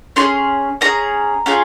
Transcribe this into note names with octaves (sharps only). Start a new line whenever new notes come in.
C#4 F4 G#4 C6
C#4 F4 G#4 A#5
C#4 F4 G#4